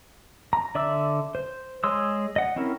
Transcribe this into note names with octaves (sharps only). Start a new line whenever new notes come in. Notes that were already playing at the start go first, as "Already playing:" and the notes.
A#5
D3 D5 E5 D6 E6
C5
G#3 C#5 C6 D#6 E6
D#5 F#5
C4 C#4 E4 A#4